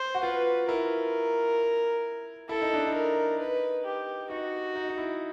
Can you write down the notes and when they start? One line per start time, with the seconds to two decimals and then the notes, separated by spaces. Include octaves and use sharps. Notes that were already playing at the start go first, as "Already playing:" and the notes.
Already playing: C5
0.15 F#4
0.23 F4 B4
0.68 E4 A#4
2.49 E4 A4
2.62 D#4
2.74 D4
2.87 D#4
2.94 A#4
3.39 B4
3.85 G4
4.30 D#4 F#4
4.76 D#4
4.89 D#4
4.98 E4